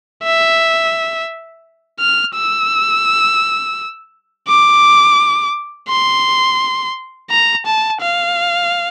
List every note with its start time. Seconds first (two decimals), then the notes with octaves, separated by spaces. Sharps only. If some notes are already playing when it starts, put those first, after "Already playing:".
0.24 E5
2.00 F6
2.35 E6
4.48 D6
5.89 C6
7.31 A#5
7.66 A5
8.01 F5